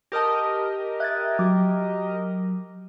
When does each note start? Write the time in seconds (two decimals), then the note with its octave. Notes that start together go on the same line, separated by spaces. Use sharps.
0.12 G4 A#4 D#5 A5 D#6 A#6
1.00 E5 F#6 G#6 A6
1.39 F#3 D6